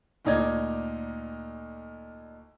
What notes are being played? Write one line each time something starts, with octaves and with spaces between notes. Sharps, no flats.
D2 A#2 D#4 D5 G#6